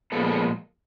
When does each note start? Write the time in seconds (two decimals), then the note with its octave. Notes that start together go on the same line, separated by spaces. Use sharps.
0.12 A#2 F3 G#3 B3 A4
0.28 A4